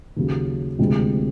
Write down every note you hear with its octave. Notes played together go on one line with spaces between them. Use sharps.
D#2 C#3 F#3
D2 C3 F3 G#3 C4